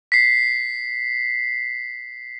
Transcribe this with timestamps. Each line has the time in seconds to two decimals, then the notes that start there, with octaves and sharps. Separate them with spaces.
0.12 B6 C7